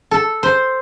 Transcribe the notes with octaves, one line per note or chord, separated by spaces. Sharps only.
A4
C5